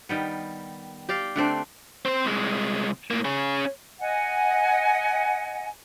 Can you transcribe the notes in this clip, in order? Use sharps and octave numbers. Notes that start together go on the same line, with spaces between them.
D#3 G3 B3
G4 D5 F5
D3 A3 C4 D4
C4 C5
C2 G#3
A2 A#3
C#4 G#4
D#5 F#5 G#5